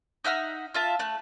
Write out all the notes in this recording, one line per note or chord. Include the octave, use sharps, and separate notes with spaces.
D#4 E5 F#5 F6
F4 E5 A5
A3 F#6